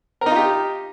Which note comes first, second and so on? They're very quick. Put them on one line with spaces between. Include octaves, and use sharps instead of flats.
A#4 D#4 F4 G4